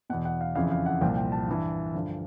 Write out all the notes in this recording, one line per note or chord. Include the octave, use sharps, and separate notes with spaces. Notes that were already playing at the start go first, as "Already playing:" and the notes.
E2 B2 F#5
F#5
F5
F2 C#3 E3 F5
F5
F#5
C2 A#2 F3 G5
G5
A5
G2 E3
G2 D3 F3